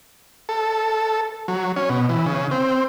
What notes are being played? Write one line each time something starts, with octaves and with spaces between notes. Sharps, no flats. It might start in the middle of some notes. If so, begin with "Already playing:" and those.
A4
F#3
C#4
B2
E3
C#3
C4